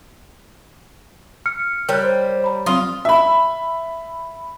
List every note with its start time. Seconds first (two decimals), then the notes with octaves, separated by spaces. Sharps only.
1.46 F6 C#7
1.89 G3 A#4 C#5 F6 F#6
2.03 C5
2.44 A#5 B5
2.66 F#3 C4 F4 D#6
3.05 E5 B5